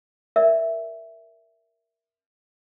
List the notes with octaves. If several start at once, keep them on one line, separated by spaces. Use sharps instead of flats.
A#4 D5 E5